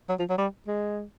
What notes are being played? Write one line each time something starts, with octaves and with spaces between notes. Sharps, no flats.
F#3
F3
F#3
G3
G#3